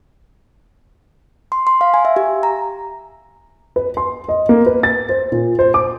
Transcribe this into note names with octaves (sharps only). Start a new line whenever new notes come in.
C6
C6
F5
G#5
E5
G4
A#5
B4
C6
D#5
A#3
B4
A6
C5
A#2
C5
D6